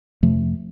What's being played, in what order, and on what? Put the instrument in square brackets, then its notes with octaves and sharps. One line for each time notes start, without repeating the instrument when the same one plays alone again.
[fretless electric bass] F2 C3 F3 A3